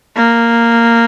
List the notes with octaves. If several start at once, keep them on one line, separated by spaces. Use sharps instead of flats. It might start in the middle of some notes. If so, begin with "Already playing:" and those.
A#3